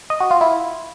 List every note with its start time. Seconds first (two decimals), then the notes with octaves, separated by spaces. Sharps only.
0.10 D#5
0.20 F#4
0.31 F4
0.41 E4